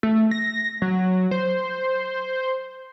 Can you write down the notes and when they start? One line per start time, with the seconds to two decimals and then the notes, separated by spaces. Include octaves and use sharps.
0.03 A3
0.31 A#6
0.82 F#3
1.31 C5